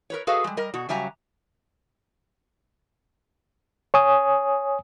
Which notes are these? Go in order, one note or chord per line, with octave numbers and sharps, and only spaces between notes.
A#4 B4 C#5
F#4 G#4 A4 B4 D#5 F5
G3 G#3
G3 A#4 D#5
B2 F#4
C#3 F#3 G3 E5 G#5 A#5
C#5 G#5 D#6